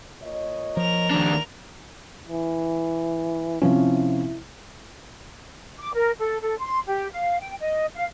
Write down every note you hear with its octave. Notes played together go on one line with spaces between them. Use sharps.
A#2 C#5 D#5
F3 A#4 F7
D#2 C3 G3 D4
E3
C3 F3 C#4 E4
D6
A#4
A4
A4
C6
G4
F5
G5
D#5
F5